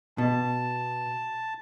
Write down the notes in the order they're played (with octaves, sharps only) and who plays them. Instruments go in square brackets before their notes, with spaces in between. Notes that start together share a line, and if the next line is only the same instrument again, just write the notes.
[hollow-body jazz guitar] B2 [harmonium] A5